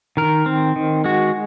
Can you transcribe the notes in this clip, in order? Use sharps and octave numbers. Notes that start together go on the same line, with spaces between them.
D#3 A#4
C4
D#3
G#3 F#4